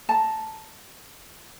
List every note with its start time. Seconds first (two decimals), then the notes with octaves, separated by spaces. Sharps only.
0.09 A5 A#5